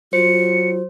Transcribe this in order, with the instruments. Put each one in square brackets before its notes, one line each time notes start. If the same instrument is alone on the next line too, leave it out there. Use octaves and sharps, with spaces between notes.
[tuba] F#3 [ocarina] F4 [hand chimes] C5 [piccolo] C#7